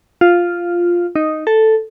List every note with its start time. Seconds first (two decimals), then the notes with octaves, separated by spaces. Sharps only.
0.21 F4
1.16 D#4
1.47 A4